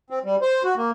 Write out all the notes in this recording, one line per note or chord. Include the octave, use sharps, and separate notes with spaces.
C4
G3
C5
F#4
A#3